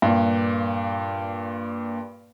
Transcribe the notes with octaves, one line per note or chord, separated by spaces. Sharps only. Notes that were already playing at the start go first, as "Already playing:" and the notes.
G2 A#2